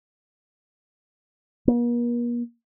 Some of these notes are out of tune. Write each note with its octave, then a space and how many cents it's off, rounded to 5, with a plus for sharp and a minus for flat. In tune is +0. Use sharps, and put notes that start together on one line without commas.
A#3 +45